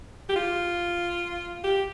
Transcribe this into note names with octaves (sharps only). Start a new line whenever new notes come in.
G4
F4
G4